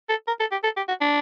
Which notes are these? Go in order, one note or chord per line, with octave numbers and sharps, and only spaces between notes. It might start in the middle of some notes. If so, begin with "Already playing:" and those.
A4
A#4
A4
G4
A4
G4
F#4
D4